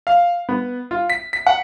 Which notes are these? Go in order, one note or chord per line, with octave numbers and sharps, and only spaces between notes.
F5
B3
F4
B6
B6
F#5